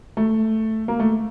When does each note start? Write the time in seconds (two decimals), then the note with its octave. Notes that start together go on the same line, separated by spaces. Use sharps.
0.17 A3
0.88 A#3
1.00 A3